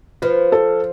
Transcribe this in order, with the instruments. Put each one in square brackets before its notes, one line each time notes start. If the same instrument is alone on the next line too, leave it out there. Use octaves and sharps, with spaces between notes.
[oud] F3 [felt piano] B4
[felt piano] A4